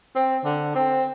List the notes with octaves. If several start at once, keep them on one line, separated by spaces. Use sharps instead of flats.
C4
D3
C4